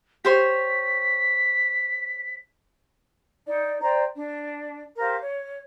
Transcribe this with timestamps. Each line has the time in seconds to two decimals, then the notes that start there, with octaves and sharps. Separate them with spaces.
0.25 G4 C5 C#5 B6
3.46 D#4 D5
3.82 C5 D5 G5 A#5
4.16 D4
4.98 G4 A#4 C5 F5
5.21 C#5